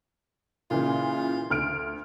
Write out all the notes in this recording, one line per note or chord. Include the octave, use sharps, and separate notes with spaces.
A#2 C#3 E3 F4
D2 F6 D7